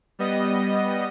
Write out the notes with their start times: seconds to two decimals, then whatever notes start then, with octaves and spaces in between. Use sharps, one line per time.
0.19 G3 B3 D#5